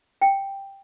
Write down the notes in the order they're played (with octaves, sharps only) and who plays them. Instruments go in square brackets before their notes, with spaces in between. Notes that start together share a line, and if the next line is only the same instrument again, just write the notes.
[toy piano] G5